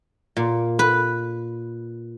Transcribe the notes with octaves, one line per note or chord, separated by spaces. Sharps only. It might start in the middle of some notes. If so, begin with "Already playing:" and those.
A#2
B4